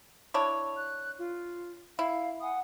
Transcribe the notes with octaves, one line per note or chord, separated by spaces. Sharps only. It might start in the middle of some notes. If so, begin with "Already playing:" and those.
D4 E4 C#5
F#6
F4
E4 F5
F#5 G#5 D#6